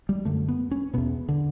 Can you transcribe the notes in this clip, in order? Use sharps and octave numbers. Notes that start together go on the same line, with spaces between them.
G3
F#2 D3 A3
B3
C#4
E2 B2 B3
D3